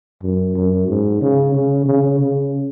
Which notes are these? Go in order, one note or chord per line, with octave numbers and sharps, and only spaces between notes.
F#2
F#2
G#2
C#3
C#3
C#3
C#3